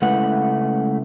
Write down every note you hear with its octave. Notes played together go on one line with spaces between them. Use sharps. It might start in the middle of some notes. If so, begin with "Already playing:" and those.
C#3 G#3 A3 E4 B4 F#5